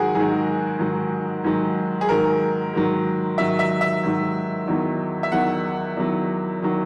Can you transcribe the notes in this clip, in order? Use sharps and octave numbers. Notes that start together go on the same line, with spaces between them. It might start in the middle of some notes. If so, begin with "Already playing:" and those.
Already playing: G#2 D#3 F#3 F#4 G#4 A#4
G#2 D#3 F#3 G#4
G#2 D#3 F#3
G#2 D#3 F#3
G#4
G#2 D#3 F#3 A#4
G#2 D#3 F#3
G#2 D#3 F#3 E5
E5
E5
G#2 D#3 F#3
E2 D#3 F#3
E5
E2 D#3 F#3 F#5
E2 D#3 F#3
D#3 F#3